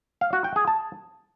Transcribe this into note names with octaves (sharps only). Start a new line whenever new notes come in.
F5
F#4
G5
G#4
A5